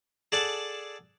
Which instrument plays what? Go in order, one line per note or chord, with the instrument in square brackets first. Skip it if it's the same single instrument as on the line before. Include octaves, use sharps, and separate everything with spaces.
[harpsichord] G#4 A4 D5 F#5 A5